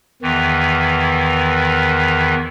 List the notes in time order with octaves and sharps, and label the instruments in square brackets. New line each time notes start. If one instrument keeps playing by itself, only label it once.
[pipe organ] E2 D#3 E3